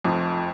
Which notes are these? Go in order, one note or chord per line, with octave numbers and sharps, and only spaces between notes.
F1 F2 F3